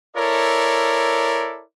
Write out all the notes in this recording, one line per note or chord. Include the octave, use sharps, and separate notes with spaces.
E4 A4 A#4 C#5 D5